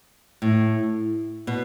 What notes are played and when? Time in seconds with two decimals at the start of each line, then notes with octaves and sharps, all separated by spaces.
0.42 A2
1.47 B2